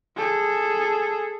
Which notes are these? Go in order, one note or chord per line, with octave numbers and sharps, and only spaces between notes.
G#4 A4